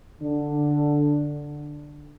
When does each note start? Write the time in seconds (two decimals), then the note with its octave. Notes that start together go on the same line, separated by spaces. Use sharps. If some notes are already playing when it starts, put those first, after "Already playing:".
0.20 D3 D4